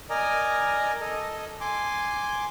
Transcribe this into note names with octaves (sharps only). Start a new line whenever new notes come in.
A#4 D5 D#5 G#5 A#5
A4 D#5
G#5 C6 D6